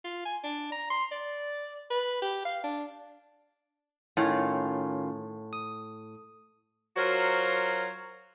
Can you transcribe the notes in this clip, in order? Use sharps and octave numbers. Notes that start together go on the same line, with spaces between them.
F4
G#5
D4
A#5
C6
D5
B4
G4
F5
D4
A2 D#3 C#4 F4
D#6
F#3 F4 F#4 A#4 C5 C#5